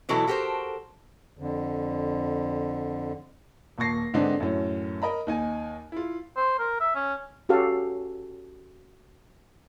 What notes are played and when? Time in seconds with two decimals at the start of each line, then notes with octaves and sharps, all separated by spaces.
0.09 B2 E3 F#3 E4 A4
0.27 F#4 G4 A4 A#4 C5
1.39 F2 D3
3.78 D#1 A#2 A5 C#6 A#6 C7
4.14 G#2 D3 B3 C4 D4 D#4
4.40 F#2 A2 C#4
5.02 A#4 D#5 A#5 B5
5.27 D#2 D#4 G#5
5.92 E4 F4
6.37 C5
6.59 A#4
6.80 E5
6.95 C#4
7.49 C#4 F#4 G4 A4 F5